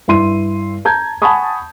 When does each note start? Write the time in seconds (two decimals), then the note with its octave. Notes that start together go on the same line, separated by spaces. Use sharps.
0.08 G2 E4 C6 D#7
0.85 A5 A#5 G6 G#6
1.22 F#5 G#5 A5 B5 C#6 D#6